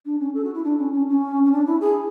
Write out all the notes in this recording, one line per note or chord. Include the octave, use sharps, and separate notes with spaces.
D4
C#4
A4
F#4
E4
D4
C#4
C#4
C#4
C#4
D4
E4
G#4